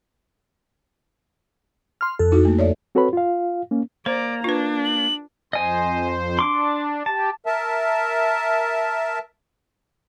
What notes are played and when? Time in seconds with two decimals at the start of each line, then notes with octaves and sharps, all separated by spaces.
2.01 C6 F6
2.19 F2 A4
2.32 D#4 E4 F#4
2.45 A3 A#3
2.59 C#5 D5 E5
2.95 C4 F#4 A4 B4 C#5 B5
3.13 F4 F5
3.71 A#3 C#4
4.06 A#3 C5 D5 A#5
4.44 D4 F4 B4
4.85 F#7
5.53 F2 C5 D#5 G#5
6.39 D4 C6 D6
7.06 G4 A5
7.46 A#4 E5 A5